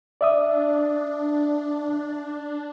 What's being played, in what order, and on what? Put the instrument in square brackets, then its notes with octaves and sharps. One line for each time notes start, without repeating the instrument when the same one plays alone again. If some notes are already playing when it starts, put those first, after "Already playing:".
[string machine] D4 [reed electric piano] D5 E5 D#6